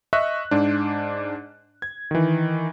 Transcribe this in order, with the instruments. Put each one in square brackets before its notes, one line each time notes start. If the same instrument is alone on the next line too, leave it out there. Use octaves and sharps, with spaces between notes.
[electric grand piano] D#5 E5 C#6 F#6
G#2 D4
G#6
D#3 E3